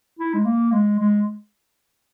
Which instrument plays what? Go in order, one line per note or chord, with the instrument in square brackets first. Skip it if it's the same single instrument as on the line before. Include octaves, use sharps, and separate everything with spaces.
[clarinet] E4
G#3
A#3
G#3
G#3